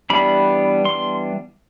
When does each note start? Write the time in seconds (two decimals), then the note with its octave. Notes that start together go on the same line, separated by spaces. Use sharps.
0.10 E3 G3 B3 D4 B5
0.85 C6